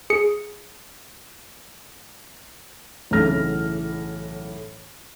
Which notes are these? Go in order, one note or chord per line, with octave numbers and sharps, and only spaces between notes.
G#4 C#7
B1 A2 C#3 E3 F6 A#6